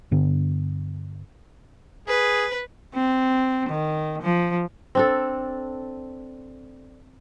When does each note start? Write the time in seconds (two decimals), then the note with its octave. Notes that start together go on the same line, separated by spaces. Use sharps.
0.11 G2 D3 B3
2.08 G#4 B4
2.94 C4
3.69 D#3
4.22 F3
4.95 C4 D4 A4